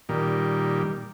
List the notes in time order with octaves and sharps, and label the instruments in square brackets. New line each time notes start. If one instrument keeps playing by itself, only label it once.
[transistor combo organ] A#2 D#3 G3